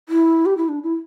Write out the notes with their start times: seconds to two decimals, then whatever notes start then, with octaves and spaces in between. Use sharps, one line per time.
0.09 E4
0.46 G4
0.57 E4
0.69 D4
0.83 E4